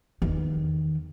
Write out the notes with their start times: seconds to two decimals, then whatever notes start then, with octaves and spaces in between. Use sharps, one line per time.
0.22 E2 D#3